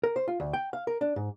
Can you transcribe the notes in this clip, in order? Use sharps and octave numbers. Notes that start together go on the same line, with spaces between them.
A#4
C5
F4
D2
G5
F5
A#4
D4
G#2